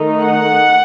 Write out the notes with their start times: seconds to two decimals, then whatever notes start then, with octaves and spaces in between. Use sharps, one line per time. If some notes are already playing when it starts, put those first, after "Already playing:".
Already playing: D#3 A3 D#4
0.21 F#5